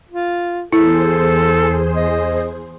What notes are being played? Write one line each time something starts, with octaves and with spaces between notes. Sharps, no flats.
F4
E2 E4 G#4 A4 C5
D#5